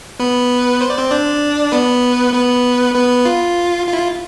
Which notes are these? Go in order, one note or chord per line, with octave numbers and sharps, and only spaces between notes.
B3 B4
C5
D5
C4 C5
D4 D5
B3 B4
B3 B4
B3 B4
F4
F4
E4
F4